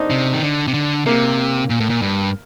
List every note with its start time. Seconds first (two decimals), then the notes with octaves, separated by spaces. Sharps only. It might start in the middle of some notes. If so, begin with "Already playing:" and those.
Already playing: C4 D4 D#4
0.10 C3
0.33 D#3
0.43 D3
0.68 C3
0.74 D3
1.06 C3 A#3
1.70 A#2
1.80 A2
1.90 A#2
2.02 G2